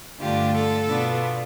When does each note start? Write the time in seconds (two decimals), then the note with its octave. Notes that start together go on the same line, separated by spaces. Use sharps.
0.20 G2 D3 A3 D4 F4 G4
0.54 A4
0.87 B2 B3 D4 F4